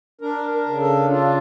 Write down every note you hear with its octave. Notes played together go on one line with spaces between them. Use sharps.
D4 A#4
A#4
C#3
A4
D4 F4